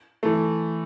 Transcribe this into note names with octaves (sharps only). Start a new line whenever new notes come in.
E3 A3